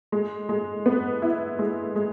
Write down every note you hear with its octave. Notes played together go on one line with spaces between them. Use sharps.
G#3
G#3
B3
E4
G#3
G#3